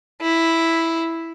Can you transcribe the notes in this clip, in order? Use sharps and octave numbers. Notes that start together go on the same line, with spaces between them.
E4